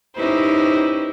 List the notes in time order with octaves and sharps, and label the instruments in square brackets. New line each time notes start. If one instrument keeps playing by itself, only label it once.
[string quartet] C#4 D#4 E4 G4 B4 C5